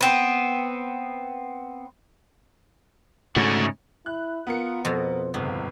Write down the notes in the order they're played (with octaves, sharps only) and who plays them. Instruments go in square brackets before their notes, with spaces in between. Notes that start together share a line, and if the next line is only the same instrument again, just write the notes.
[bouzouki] B3 C4
[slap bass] G#2 C#3 [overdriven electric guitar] A3 F#4
[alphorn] E4 [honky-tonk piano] F#6
[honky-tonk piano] B3 A#4 C#7 [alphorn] F4
[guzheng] F2 B2 [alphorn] C5
[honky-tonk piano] G1 C#2 [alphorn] G#2 [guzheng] B3